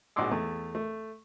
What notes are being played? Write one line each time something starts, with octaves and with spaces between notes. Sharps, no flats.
A#1 G#2 F#4 C6 D6 E6
E2 A3
A3